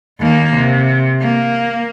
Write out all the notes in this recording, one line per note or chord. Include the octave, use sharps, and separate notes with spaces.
D#2 A#3
C3
A#3